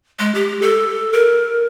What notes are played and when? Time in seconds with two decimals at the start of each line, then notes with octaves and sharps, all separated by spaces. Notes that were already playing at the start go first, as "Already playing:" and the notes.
0.19 G#3
0.35 G4
0.62 A4
1.13 A#4